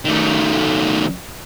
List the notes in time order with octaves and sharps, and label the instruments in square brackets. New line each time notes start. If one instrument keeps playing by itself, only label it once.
[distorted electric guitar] D#3 A3